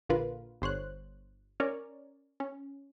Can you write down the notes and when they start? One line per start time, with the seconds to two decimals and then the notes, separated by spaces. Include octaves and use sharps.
0.09 A#1 D3 F4 A#4 B4
0.62 G1 C5 C#5 F#6
1.60 C#4 A#4 C#5 D5
2.40 C#4